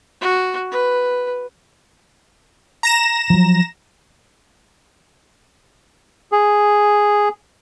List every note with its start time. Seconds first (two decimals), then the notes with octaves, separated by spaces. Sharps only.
0.21 F#4
0.71 B4
2.83 A#5 A#6 E7
3.30 F3 F#3
6.32 G#4